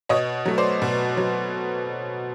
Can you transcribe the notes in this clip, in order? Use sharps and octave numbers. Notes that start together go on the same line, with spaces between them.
B2 C#5 D#5
F#3 A3
C5 D5
B2
F#3